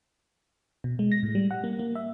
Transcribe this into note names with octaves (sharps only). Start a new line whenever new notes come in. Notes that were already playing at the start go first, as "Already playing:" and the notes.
B2
G#3
A#6
A2
G3
F#5
A#3
A#3
E5